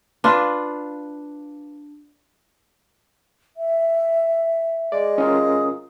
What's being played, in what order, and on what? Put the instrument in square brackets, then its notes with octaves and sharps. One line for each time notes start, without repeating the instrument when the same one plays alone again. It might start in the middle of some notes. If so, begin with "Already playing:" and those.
[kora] D4 F4 B4
[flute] E5
[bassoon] G#3 [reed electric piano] D5
[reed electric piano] C#4 F4 A#4 [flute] D#6